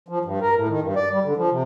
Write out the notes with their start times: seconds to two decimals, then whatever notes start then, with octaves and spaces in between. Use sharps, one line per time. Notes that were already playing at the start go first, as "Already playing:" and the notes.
0.08 F3
0.25 G2
0.41 A#4
0.56 A2
0.68 D#3
0.82 G2
0.96 D5
1.12 G3
1.24 D3
1.37 F3
1.51 C3